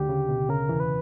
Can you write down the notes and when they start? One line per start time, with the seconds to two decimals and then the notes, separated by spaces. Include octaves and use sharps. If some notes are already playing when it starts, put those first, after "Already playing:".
Already playing: D2 D3 G4
0.09 C#3
0.29 B2
0.49 C#3 A#4
0.69 E2 E3
0.80 B4